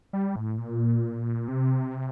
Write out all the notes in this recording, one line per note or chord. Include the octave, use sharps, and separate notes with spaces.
G3
A2
A#2
C3